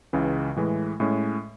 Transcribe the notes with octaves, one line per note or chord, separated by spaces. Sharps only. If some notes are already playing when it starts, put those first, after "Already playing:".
C#2 C#3 E3
A2 E3 G#3
A2 G#3 C#4